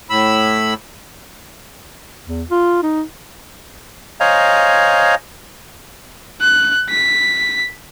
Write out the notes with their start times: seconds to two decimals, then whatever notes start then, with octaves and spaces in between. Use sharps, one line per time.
0.10 A2 B5 E6
2.26 E2
2.51 F4
2.83 D#4
4.20 C5 C#5 D#5 F5 G#5 A#5
6.42 F#6
6.90 B6